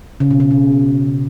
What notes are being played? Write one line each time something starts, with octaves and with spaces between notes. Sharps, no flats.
C#3
B2
C#3
B2